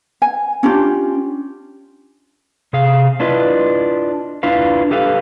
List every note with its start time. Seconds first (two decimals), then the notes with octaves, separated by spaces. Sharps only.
0.22 G#5
0.63 C#4 D4 F4 G4
2.73 C3 G#4 F5
3.20 D4 E4 F4 B4 D#5
4.43 D4 E4 F4 B4 F5
4.91 G4 A4 B4 F5